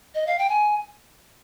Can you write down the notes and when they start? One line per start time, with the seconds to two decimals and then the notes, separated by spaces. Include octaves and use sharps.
0.15 D#5
0.27 F5
0.39 G5
0.49 G#5